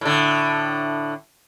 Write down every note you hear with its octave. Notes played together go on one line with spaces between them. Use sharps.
A2 D3